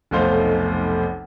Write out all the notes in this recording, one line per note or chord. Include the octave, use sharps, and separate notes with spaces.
F1 B1 A3 C5 F5